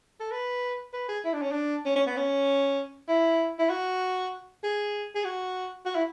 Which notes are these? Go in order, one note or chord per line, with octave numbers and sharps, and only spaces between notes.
A4
B4
B4
G#4
E4
D4
C#4
D4
C#4
C#4
B3
C#4
E4
E4
F#4
G#4
G#4
F#4
F#4
E4